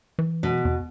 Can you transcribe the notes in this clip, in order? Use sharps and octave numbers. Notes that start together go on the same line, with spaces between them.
E3
B2
E2